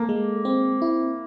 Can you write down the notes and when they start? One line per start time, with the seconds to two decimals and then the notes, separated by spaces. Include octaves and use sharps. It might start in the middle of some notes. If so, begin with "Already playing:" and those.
Already playing: A#3 A4
0.09 G#3
0.45 C4
0.82 E4